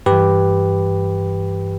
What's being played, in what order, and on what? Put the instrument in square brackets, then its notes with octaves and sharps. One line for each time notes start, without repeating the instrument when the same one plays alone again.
[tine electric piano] G2 E3 G4 B4